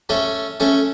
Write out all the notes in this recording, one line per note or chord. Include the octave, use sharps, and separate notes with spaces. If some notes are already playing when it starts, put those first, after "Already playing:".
A3 C#4
A3 C#4